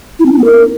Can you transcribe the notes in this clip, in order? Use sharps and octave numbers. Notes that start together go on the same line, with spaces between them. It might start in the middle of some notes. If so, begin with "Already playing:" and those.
E4
C4
D4
B3
A#4